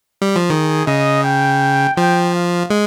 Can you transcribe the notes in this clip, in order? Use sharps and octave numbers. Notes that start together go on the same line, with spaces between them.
G3
F3
D#3 G#4
C#3 D#5
G5
F3 G5
F5
G#3